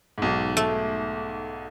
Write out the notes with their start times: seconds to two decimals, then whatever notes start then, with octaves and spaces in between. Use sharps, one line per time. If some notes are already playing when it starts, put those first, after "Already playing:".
0.18 B1 G#2
0.57 A3